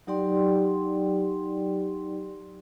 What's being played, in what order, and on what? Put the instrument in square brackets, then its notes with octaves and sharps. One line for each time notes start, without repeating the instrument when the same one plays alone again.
[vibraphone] F#3 D#4 G4 D5 G5 C6